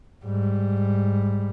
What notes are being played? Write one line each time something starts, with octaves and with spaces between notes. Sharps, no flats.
G#2 G3